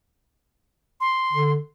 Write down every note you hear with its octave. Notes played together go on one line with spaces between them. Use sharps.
C6
D3